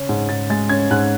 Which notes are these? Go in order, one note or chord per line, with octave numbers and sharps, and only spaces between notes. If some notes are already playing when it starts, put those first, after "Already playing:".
Already playing: C#3 C#4
G#2
G#2 A6
G#3 A6
C#4 G#6
G#2 F#6